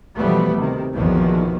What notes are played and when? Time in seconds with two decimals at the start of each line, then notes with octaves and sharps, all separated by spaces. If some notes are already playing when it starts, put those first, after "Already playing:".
0.15 B2 E3 F3 G3 A3 B3
0.54 D2 C3 D#3
0.93 A#1 E2 B2 D#3 F3 F#3